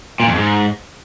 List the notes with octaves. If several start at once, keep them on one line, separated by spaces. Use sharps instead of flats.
A#2
F2
G#2